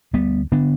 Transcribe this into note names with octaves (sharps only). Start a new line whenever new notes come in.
D2 G3 B3
D3 B3 D4